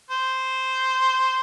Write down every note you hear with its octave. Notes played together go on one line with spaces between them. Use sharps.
C5